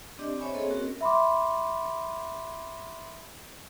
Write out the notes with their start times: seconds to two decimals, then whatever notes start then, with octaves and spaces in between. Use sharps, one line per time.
0.19 C4 D4 G4 D5 D#5
0.39 C5 C#5 E5 G#5 B5 C#6
0.54 A#3 C4 G#4 A4 C#5 D#5
0.70 C4 C#4 F#4 A#4
1.01 E5 B5 C6 D6